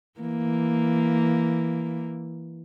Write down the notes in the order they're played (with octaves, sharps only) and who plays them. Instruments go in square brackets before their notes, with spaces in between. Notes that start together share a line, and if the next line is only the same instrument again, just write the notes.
[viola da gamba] E3 A#3